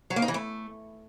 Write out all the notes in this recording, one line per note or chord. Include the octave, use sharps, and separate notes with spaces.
F#3
A#3
D#4
E3
A3